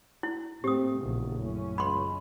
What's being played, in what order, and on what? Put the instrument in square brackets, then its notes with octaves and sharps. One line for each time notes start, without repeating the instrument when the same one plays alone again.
[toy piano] E4
[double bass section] A2 A3 A#3 [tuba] C4 [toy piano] G4 D#6
[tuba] E1 [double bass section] A#1 C#3
[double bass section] F#2 C#4 [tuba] A2
[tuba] C#2 [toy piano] B5 C6